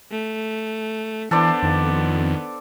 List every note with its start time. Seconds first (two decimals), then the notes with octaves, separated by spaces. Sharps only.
0.11 A3
1.31 E3 B3 D4 A4 C5 D5
1.63 F2 D#3